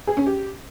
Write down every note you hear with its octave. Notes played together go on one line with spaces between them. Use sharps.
G#4
C#4
G4